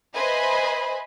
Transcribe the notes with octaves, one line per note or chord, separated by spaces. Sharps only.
B4 C5 D#5 E5 G#5 B5